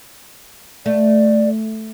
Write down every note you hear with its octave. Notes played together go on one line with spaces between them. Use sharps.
A3 D5